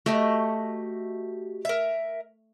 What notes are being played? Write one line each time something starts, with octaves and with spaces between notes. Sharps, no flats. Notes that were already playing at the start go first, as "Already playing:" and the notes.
A3 F#4 G4 D#5
A#4 E5